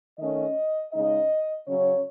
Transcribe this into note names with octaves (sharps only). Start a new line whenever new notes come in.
D#3 A3 C#4 D#5
C#3 G#3 D#4 D#5
C#3 F#3 C#4 C#5